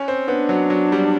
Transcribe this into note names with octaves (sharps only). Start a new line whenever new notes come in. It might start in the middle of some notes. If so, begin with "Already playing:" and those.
Already playing: C#4
C4
B3 D4
F#3
F#3
G3